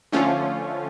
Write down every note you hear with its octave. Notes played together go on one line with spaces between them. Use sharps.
D3 F3 A3 C#4 F4